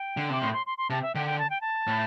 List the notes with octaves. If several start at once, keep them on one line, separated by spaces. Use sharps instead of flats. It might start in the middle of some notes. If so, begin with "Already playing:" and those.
Already playing: G5
D3
C3 D6
A2 C6
C6
C6
C6
C3 A5
E5
D3 G5
G5
A5
G5
A5
A2